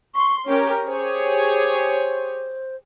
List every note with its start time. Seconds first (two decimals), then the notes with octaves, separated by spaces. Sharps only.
0.15 C6 C#6
0.46 C#4 G4 A#4 C#5
0.86 G4 G#4 C5 C#5